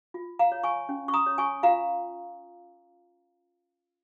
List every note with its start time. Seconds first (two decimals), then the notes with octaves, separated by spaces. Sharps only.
0.14 F4
0.39 F5 A#5
0.52 C#5
0.63 G#5 C#6
0.89 C#4
1.08 C#6
1.14 A#5 D#6
1.26 C#5
1.38 G#5 C#6
1.63 F4 F5 A#5